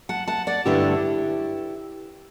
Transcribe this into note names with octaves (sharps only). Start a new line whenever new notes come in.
F#5 A5
F#5 A5
D5 F#5
G2 D3 A3 D4 E4 G4